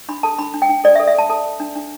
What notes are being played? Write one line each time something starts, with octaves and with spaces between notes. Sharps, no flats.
D4 B5
A4 A5
D4 B5
D4
G5
D4
A4 D5
E5
A4
E5
A4 A5
A4 A5
A4
D4
D4